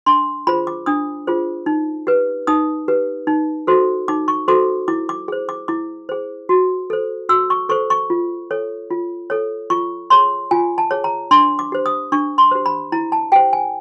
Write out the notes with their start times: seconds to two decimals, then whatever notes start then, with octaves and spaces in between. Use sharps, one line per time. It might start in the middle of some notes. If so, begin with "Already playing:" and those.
0.06 D4 C6
0.47 F4 G#4 C5 B5
0.67 D6
0.86 D4 D#6
1.27 F4 G#4 C5
1.66 D#4
2.07 G4 B4
2.47 D#4 D#6
2.88 G4 B4
3.27 D#4
3.67 F#4 A4 C5
4.08 D#4 D6
4.28 C#6
4.48 F#4 A4 C5 D6
4.88 E4 D6
5.09 D6
5.28 G#4 C5
5.49 D6
5.68 E4 D6
6.09 G#4 C5
6.49 F#4
6.90 A4 C5
7.29 F#4 E6
7.50 C#6
7.69 A4 C5 C#6
7.90 C#6
8.10 F4
8.51 A4 C#5
8.91 F4
9.30 A4 C#5
9.70 F4 C#6
10.10 G#4 C#5 C6
10.51 F4 G#5
10.78 A5
10.91 G#4 C#5
11.04 A#5
11.31 D4 C6
11.59 D6
11.72 G4 C5
11.86 D#6
12.12 D4 C#6
12.38 C6
12.51 G4 C5
12.66 B5
12.92 E4 A#5
13.12 A5
13.32 G4 C5 G5
13.53 G#5